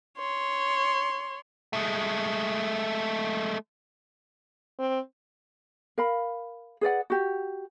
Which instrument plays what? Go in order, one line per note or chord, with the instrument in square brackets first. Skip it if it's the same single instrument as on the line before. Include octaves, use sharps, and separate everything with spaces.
[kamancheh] C#5 C6
[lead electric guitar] G#3 A3
[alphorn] C4
[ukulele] A#4 F5 B5
G#4 B4 D5 F#5
F#4 G4